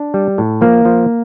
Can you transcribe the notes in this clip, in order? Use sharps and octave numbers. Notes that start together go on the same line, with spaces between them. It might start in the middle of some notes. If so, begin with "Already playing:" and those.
Already playing: D4
G3
A2
F3 A#3
F3